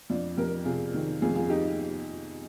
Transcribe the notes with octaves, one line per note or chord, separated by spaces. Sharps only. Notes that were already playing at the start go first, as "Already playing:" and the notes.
F2 D4 F4
F2 G4 A#4
C3 F4 G#4
D#3
F2 F4 G#4
F4 G#4
D#4 G4